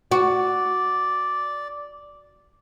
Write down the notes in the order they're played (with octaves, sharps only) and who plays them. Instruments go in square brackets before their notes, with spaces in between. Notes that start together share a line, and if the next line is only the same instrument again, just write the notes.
[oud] F#4 [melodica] D5